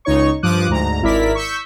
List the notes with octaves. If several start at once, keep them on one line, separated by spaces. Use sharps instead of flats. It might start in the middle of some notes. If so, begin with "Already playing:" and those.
C#2 D#4 C#5 C#6
G2 F3 D6 D#6 F#6
D2 G#2 A#5
G#1 E4 A#4 D5 B6
C#6 E6 G6 B6